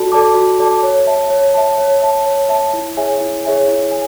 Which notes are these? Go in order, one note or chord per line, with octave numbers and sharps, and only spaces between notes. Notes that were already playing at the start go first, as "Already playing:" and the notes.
Already playing: F#4 A4 D5 A5
A4 D5 A5 D6
F#4
A4 D5 A5 D6
C#5
E5 A5
C#5
E5 A5
C#5
E5 A5
C#5
E5 A5
E4
G#4 C#5 E5 G#5
E4
G#4 C#5 E5 G#5
E4
G#5